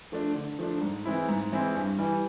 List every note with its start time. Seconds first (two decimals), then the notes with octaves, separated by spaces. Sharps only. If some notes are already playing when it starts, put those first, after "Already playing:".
0.12 F3 A3 D4
0.35 D3
0.59 F3 A3 D4
0.82 G#2
1.05 E3 G#3 C4 E4
1.29 G#2
1.52 E3 G#3 C4 E4
1.75 G2
1.98 E3 G3